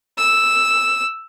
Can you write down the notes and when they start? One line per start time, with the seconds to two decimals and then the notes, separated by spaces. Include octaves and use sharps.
0.18 E6